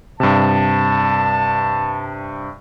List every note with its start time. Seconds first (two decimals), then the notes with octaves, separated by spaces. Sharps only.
0.20 G2 C3 A5